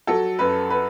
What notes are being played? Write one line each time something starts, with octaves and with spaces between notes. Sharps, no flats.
F#3 A4
F#2 B4
B4